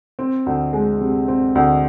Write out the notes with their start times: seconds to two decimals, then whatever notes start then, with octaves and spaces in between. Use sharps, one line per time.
0.19 C4
0.46 D2
0.73 G#3
1.01 C3
1.28 C4
1.55 D2